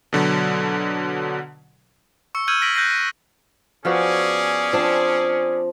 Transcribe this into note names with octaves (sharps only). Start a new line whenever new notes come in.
B2 D3 F#3
C#6 E6 C#7
E6 F6 G6 G#6 D#7 F#7
F6 A#6 B6 D7 F#7
F#6 G6 A#6 C7 D#7
D#7
F3 B3 C#4 F#4 G#4 D5
F3 C4 D4 F5